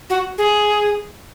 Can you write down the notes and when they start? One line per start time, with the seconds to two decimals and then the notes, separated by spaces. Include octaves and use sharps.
0.10 F#4
0.38 G#4